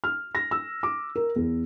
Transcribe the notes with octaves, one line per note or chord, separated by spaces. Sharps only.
F6
A#6
E6
D6
A#4
E2